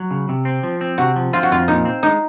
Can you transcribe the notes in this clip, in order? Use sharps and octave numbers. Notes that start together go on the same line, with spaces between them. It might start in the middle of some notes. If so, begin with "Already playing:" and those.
Already playing: F#3
C#3
C3
C4
F3
C4
C3 F#4
F3
C4 F4
F#4
F2 F4
A#2 D#4
C4
G#3 D#4